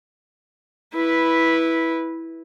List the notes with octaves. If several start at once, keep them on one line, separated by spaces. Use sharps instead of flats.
E4 B4